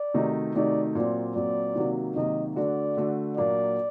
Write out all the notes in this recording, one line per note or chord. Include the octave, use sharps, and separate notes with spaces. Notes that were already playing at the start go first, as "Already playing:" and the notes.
Already playing: D5
C3 D#3 A3 D#4 F#4
C3 D#3 A3 D#4 F#4 D5
A#2 F#3 C4 D5
A#2 F#3 C4 D5
C3 D#3 F#3 A#3 F#4
C3 D#3 F#3 A#3 F#4 D#5
D3 A3 D4 F#4 D5
D3 A3 D4 F#4
A#2 F#3 A#3 D4 F#4 D5